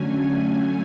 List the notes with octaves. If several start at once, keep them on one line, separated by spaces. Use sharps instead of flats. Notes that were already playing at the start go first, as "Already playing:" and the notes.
Already playing: D3 F#3 A3 C#4 G#5
G#5